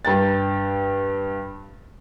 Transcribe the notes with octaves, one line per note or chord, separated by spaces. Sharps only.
G2 G5 A6